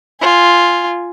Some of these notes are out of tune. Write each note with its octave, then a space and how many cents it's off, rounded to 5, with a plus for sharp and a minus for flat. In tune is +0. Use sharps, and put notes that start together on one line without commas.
F4 +0 G#5 +0